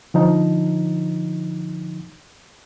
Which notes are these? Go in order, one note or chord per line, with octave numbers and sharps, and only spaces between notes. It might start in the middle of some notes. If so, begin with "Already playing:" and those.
D3 F3 D#4